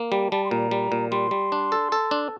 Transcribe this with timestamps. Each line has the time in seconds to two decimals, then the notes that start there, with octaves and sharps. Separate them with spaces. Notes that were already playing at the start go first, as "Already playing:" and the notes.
Already playing: A#3
0.11 G3 G5
0.31 G3 A5
0.45 C6
0.51 A#2 A#5
0.71 G3
0.92 A#2
1.11 G3 C6
1.31 G3
1.52 D4
1.72 A4
1.92 A4
2.11 D4